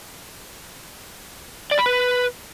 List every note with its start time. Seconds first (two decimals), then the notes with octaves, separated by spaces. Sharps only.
1.71 D5
1.79 B5
1.86 B4